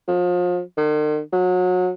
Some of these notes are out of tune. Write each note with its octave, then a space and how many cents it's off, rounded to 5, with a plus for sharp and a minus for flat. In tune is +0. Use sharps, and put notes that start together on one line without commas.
F3 +35
D#3 -45
F#3 -30